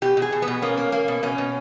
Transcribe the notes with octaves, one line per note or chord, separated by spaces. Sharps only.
B2 G4
B2
G#4
B2
B3
B2
A#3 C#4
A#3
A#3
B2
B2 C#4
B2